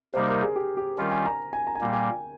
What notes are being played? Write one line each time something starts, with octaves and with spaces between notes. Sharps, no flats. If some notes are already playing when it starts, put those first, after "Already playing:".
C3 G3 A#3 D#4 C5
A#4
G#4
G4
G4
D#3 G3 C#4 F4 A#4
G#5
A#5
G#5
A#5
G#5
A#2 G3 A#3 G5
G#5